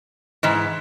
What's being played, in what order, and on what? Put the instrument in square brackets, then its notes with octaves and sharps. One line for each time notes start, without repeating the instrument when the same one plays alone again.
[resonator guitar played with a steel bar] G#2 E3